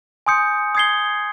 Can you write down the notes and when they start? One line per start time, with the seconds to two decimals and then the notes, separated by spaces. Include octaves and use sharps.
0.26 G#5 C6 D#6 G6 C#7
0.75 D#6 G#6 C7 G7